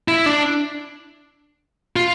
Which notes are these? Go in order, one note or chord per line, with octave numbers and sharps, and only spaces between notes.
E4
D4
F4